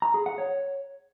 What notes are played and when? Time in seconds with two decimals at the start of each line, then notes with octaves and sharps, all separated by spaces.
0.02 A#5
0.14 G#4
0.26 F#5
0.38 C#5